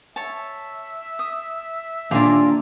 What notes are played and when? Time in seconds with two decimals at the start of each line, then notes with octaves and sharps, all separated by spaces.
0.16 C#5 E5 A5
1.19 D#6
2.11 D#2 A#2 D4 F5 G#5 A#5